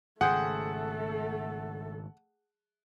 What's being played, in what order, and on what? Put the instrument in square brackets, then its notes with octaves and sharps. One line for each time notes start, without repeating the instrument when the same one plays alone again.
[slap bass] G#1 C#3 [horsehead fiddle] A3 A4 [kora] G#4 C5 G5 [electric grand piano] F#5